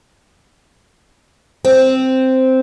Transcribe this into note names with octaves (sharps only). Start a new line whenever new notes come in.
C4